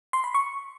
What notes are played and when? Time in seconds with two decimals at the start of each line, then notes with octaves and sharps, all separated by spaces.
0.13 C6
0.24 B5
0.34 C#6